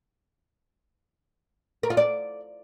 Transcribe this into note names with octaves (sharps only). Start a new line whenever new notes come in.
A#4
F4
D5